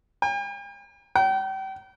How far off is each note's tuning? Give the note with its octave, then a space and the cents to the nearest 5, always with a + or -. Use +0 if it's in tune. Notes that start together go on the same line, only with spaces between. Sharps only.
G5 +45
G5 -35